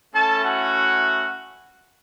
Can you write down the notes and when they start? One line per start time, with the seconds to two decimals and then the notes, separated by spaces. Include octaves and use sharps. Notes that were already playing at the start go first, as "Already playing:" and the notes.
0.14 A3 C#4 E4 A4 A5
0.44 F#4 F#5